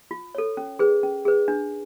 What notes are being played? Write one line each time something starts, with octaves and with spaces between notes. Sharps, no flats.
F4
A4 C#5
C#4
G#4 B4
C#4
G#4 B4
D4